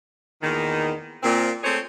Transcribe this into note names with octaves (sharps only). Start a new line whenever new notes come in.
E2 A#2 D#3
A#2 C4
A3 C4 G#4 C5 C#5